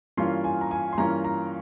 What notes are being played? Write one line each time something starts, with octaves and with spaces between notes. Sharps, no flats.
G2 E3 A#3 C#4 F4 C6
G#5
A#5
G#5
C6
G2 E3 A#3 C#4 F4 A#5
A#5